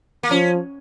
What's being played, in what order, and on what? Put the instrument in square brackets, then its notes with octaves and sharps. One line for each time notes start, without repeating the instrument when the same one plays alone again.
[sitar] A#3
[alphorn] F3 [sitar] C#4